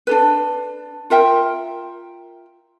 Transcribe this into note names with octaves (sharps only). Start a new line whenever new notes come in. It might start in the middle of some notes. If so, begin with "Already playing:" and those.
D4 A4 B4
F4 A#4 E5 G5